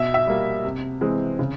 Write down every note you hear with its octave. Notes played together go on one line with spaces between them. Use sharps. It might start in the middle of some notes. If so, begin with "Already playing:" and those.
Already playing: B2 E5
E5
G3 A#3
C3
E3 G#3 C4
C#3